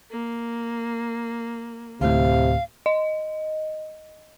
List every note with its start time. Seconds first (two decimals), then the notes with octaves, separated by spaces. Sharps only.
0.11 A#3
2.01 D2 A2 C3 F5
2.86 D#5